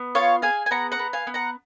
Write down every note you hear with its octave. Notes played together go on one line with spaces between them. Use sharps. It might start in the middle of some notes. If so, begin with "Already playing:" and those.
Already playing: B3
F4 C#5 F5
G#4 F5 G#5
G#5
B3 F#5 A#5
F#5 A#5
B3
F5 G#5
B3
F#5 A#5